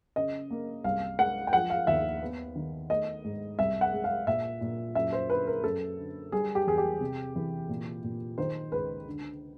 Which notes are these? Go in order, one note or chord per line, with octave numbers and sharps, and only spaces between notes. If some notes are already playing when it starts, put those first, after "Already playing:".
C#3 D#5
A#3
C2 F5
G#3 F#5
G5
F3 F#5
F5
D#2 E5
B3
D#3
A3 D#5
G#2
C2 E5
F#5
G#3
F5
A#2 E5
A#2
F#2 E5
C5
D3 B4
A#4
F#2 A4
D3
G3 G#4
G4
E2 G#4
G4
C3
E3
A#2
A#2
D#3 C5
C#2 B4
D3